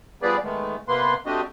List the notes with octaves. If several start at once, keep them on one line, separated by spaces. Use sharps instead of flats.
F3 G3 B3 G#4 B4 D5
D#3 G#3 A3 B3
C3 A#3 B3 B4 C6
A3 C4 D4 F#4 G4 D#5